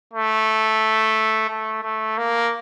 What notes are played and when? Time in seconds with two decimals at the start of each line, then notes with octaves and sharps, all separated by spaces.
0.13 A3
1.49 A3
1.83 A3
2.18 A#3